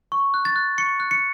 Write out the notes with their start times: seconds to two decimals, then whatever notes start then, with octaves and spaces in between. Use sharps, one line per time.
0.12 C#6
0.34 F#6
0.45 A6
0.56 F#6
0.78 C#6 C#7
1.00 F#6
1.11 C#7